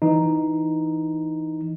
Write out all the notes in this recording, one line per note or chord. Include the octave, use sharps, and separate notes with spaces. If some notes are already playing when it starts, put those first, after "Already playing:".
E3 D#4